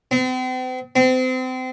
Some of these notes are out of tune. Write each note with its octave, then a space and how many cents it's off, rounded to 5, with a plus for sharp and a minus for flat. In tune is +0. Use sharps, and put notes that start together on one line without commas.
C4 -40
C4 -30